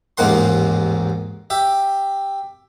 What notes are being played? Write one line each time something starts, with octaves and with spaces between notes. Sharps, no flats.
A1 D#2 G#2 A#3 F#5 C6
G4 E5